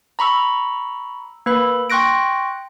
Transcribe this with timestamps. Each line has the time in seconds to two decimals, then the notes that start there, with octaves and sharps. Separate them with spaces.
0.19 A#5 B5 C#6 E6
1.46 A#3 B4 B5
1.90 G5 C6 C#6 F#6 A#6 D7